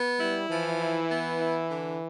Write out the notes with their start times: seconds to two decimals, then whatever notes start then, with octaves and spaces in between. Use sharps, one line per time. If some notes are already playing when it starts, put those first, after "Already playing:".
Already playing: B3
0.19 G3 E4
0.49 E3 F3
0.79 E4
1.10 B3
1.40 E4
1.71 D3